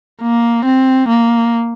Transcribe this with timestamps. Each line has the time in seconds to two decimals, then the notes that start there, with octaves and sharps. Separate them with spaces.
0.22 A#3
0.65 C4
1.08 A#3